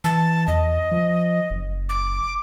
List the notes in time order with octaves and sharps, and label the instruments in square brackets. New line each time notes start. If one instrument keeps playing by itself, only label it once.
[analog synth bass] E3 [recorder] A5
[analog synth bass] E2 [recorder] D#5
[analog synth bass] F3
F#1
[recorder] D6